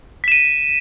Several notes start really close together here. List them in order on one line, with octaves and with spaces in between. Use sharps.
B6 E7 D#7